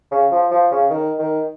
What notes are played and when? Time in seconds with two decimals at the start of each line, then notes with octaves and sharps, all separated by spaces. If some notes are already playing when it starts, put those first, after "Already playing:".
0.12 C#3
0.32 F3
0.52 F3
0.71 C#3
0.90 D#3
1.19 D#3